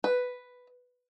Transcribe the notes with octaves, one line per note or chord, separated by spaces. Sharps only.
B4